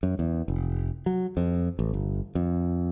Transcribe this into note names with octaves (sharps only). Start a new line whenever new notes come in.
F#2
E2
F1
F#3
F2
A1
G1
F2